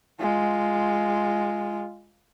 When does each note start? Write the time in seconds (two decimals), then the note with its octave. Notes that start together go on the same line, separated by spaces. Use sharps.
0.20 G#3 F4